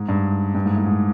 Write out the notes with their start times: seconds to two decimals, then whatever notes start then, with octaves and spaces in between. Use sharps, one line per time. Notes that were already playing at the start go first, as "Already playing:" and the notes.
Already playing: G#2
0.09 G2
0.55 G2
0.65 G#2
0.76 A2
0.86 G#2